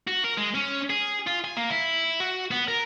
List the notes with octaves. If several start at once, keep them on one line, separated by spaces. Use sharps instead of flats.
F#4
A#4
G#3
C#4
G#4
F4
G#5
A#3
E4
F#4
B3
A#4